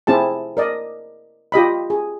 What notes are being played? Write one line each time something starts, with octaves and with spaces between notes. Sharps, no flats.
C4 E4 G#4 A5
A#4 D5 D#5
F4 G4 D#5 B5
G#4